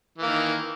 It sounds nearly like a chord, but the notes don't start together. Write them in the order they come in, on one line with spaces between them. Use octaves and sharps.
E3 A#3 D#3